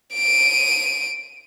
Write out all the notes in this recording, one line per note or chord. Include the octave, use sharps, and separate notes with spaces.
D7 D#7